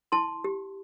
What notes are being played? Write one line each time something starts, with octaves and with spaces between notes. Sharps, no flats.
E4 A5 C6
G4